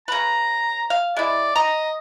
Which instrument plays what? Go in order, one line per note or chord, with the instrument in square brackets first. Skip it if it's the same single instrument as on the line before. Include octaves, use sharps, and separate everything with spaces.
[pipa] C#3 B4 [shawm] A#5
[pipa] F5
[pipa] G#3 E4 [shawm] D5
[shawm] D#5 [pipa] A#5